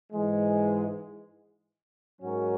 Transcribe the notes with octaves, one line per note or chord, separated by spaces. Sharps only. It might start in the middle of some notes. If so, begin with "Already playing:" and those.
G#2 E3 G#3
G#2 F#3 C#4 F#4 A#4